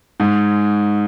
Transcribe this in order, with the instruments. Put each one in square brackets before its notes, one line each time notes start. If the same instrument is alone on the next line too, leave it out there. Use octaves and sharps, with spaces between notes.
[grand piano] G#2